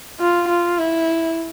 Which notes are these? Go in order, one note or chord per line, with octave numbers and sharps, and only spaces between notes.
F4
F4
E4